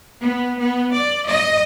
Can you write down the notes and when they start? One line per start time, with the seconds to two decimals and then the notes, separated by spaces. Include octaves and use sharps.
0.23 B3
0.61 B3
0.93 D5
1.27 D#5